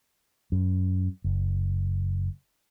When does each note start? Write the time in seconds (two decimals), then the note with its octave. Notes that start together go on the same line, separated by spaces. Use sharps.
0.52 F#2
1.24 F#1